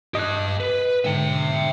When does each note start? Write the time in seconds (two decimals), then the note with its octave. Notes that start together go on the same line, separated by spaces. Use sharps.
0.15 G4 D#5 A5 F#6
0.60 B4
1.05 G#2 D3 E5 G5